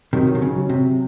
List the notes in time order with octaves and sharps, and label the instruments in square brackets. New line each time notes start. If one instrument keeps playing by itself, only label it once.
[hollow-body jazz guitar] C3 D#3 [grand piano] F#3
[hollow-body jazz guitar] C3
C#3
[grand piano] F#3
[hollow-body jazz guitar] C3